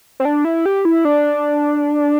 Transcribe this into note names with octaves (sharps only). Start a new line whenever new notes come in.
C4
D4
E4
G4
E4
D4